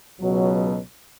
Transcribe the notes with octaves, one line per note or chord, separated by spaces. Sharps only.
C#2 B2 F#3